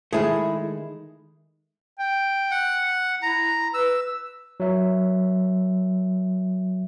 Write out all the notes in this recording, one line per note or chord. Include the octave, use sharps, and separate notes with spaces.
D#3 G#3 A3 E4 G#4
G5
F#5
E4 A#5
B4 E6
F#3 E5